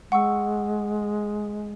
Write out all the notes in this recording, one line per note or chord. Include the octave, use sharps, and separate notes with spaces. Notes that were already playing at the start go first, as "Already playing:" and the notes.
G#3 F#5 C#6 E6